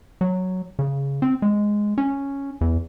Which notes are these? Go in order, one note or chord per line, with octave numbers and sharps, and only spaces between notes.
F#3
C#3
C4
G#3
C#4
E2